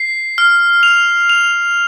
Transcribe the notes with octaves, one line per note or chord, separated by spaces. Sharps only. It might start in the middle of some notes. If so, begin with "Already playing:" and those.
Already playing: C7
F6
F7
F7